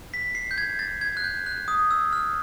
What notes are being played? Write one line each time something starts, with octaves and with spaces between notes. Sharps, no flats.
B6
C7
G6
G#6
A6
G#6
F#6
G6
F#6
D#6
E6
F6